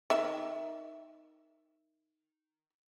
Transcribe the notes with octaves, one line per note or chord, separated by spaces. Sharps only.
D#3 E5